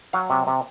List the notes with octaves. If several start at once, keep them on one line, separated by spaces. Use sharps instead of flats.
F#3 F5
C3
C3